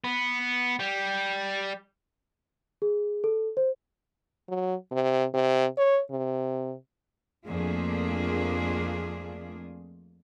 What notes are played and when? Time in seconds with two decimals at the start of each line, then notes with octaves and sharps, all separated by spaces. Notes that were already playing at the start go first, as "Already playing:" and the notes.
0.04 B3
0.80 G3
2.82 G#4
3.24 A4
3.57 C5
4.49 F#3
4.91 C3
5.34 C3
5.78 C#5
6.11 C3
7.47 F2 A3 A#3 D4 F4 G#4